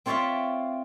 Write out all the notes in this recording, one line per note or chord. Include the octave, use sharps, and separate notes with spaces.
C4 F4 C#5 D5 E5 F5